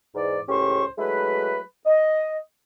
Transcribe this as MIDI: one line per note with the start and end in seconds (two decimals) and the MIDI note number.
0.15 0.40 40
0.15 0.40 44
0.15 0.40 74
0.48 0.84 37
0.48 0.84 45
0.48 0.84 61
0.48 0.84 67
0.48 0.84 72
0.48 0.84 85
0.98 1.59 54
0.98 1.59 56
0.98 1.59 57
0.98 1.59 64
0.98 1.59 71
1.86 2.36 75